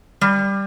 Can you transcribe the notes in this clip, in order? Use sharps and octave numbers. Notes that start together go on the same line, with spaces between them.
G3